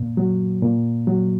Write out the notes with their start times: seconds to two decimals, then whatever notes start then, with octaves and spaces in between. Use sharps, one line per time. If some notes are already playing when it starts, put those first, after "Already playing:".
Already playing: A#2
0.17 F#3
0.62 A#2
1.07 F#3